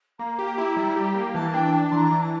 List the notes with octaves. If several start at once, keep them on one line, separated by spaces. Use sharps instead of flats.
A#3 A#5
G4
E4
G3
G4
A#3
E3 A5
D4 G5
D4 A5
E3 A#5 C6
E3
A5